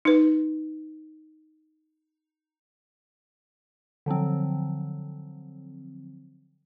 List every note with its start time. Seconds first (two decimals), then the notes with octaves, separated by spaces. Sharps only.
0.05 D#4 B4
4.06 D3 F3 F#3 C4